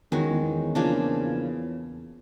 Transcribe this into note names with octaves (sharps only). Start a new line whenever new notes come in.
E2 D#3 G#3 C#4 F#4
E2
E2
C#3 F3 A#3 D4